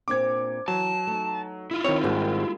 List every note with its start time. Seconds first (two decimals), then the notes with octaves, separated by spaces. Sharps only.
0.08 A#2 C4 D4 D6 G#6
0.68 E3 F#3 A5
1.07 A3 D#4
1.71 E4 F4
1.84 D#3 C4 C#5
2.04 G#1 G3 G#3 A#3